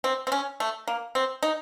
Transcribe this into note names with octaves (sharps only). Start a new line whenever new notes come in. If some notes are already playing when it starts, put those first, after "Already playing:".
C4
C4
C#4
A3
A#3
C4
D#4